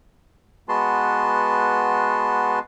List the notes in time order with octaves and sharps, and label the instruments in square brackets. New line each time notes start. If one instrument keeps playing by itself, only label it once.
[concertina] G#3 B3 F#4 B4 A5 C6